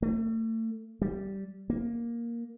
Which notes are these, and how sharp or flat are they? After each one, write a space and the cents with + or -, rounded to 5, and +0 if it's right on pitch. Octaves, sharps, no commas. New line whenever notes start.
A3 +35
G3 -10
A#3 +5